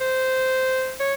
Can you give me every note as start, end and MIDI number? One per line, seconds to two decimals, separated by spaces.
0.01 0.94 72
1.00 1.14 73